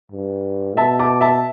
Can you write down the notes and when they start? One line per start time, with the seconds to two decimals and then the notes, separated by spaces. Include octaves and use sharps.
0.12 G2
0.76 B2 E5 A5
0.99 A5 D6
1.21 E5 A5